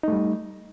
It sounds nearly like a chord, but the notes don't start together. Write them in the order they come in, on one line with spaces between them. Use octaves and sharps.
D#4 A3 G3